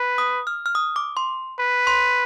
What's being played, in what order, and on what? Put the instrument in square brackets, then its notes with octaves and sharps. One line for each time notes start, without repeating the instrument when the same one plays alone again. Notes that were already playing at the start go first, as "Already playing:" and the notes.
Already playing: [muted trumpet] B4
[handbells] D#6
F6
F6
D#6
D6
C6
[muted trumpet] B4
[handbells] C6